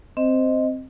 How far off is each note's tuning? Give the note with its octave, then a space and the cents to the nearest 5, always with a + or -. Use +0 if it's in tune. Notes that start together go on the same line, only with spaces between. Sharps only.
C4 +0 C5 -10 D#5 +0